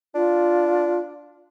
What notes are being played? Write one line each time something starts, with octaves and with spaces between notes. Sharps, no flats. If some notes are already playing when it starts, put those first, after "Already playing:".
D4 F4